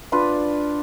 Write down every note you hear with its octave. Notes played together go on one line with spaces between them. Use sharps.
D4 F4 B4 D5